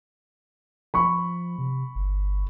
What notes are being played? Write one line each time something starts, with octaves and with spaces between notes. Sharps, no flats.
F3 B5 C#6
C3
G1